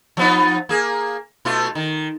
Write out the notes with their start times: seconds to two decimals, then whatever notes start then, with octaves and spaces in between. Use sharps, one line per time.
0.17 F3 B3 D#4
0.69 A#3 G#4
1.45 B2 A3 F4
1.75 D#3